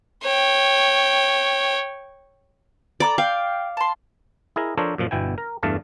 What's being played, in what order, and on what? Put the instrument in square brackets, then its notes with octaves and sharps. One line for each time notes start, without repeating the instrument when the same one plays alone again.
[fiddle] C#5 G5
[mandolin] A4 A#5 D6 [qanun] D5
[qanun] F5 [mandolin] G5
[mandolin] A5 C6
[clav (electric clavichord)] E4 G#4 A#4 D#5
F3 D4 A4 A#4 C5 C#5
F#2 A#2 F3
G1 B2 E4 G5 G#5
A#4
E2 G2 A3 F5 A5